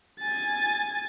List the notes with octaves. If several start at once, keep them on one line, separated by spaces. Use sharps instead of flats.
G#5 A6